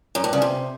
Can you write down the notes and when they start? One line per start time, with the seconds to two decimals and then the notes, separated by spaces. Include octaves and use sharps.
0.15 F#2
0.24 G2
0.33 C#3
0.42 C3